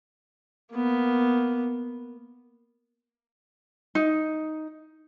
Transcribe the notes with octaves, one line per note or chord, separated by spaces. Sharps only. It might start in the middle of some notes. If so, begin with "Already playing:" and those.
A#3 B3
D#4